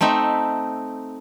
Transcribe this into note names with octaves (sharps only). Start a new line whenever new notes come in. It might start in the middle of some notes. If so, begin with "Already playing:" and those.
A3 C4 D#4 E5